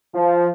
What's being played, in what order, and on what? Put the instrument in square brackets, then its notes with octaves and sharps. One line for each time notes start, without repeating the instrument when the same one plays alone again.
[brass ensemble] F3